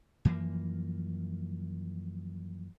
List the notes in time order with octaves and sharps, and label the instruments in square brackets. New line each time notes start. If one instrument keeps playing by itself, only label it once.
[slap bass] F#2 E3 F3 A#3